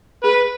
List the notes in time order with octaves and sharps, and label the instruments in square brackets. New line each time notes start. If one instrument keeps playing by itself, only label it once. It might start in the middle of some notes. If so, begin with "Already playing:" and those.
[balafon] G#4 [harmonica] B4